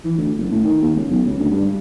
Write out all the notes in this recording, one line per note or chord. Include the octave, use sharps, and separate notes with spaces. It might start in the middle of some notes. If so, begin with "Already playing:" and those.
E3
D2
F#1
A2
D#3
D#2
C#2
B1
C#2
D2
G2